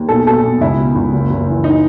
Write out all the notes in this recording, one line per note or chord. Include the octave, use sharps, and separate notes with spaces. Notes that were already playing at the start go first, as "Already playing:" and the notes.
Already playing: D#2
B1 A4
B2 A4
B1
C#2 E4
B2
C#2
F#1
F#1
E3
D#4